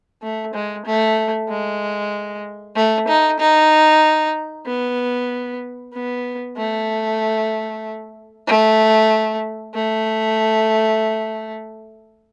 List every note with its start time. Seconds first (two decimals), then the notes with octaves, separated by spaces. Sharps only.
0.22 A3
0.54 G#3
0.86 A3
1.49 G#3
2.76 A3
3.08 D#4
3.40 D#4
4.66 B3
5.93 B3
6.57 A3
8.47 A3
9.74 A3